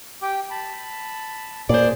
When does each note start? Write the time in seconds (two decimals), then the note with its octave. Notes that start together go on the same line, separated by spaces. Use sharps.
0.22 G4 G5 D6
0.51 A5 B5
1.69 A#2 G#4 C5 D5